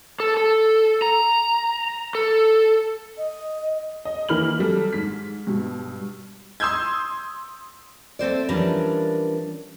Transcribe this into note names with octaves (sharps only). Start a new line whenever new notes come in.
A4
A4
A#5
A4
D#5
D#5
E3 A#3 B5 F6 F#7
F#3 G3 A4
G#2 B6
G2 B2
C6 D#6 E6 G6 G#6
A3 C4 C5 D5
E3 F3 G3 C#4 D4 A#4